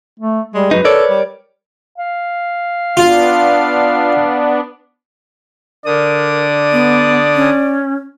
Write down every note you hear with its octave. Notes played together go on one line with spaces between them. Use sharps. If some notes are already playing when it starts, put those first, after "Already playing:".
A3
G3 G#3
F#2 F#3 D#4 B4
A4 A#4 C#5 D5
G3
F5
B3 D4 F4
D3 A#4 D5 D#6
B3
C#4